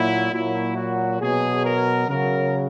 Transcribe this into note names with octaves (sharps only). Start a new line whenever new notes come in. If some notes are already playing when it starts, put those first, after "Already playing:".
Already playing: A#2 F#3 E4
A#2 F#3 E4
F#4
B2 F#3 G#4
A#4
C#3 F#3 A#4